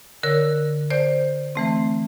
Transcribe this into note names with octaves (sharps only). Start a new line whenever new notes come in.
D3 A#4 C#5 E6
C5 D5 G6
E3 A3 C4